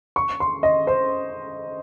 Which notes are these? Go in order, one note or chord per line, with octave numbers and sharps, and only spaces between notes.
C#6
C6
D#5
C5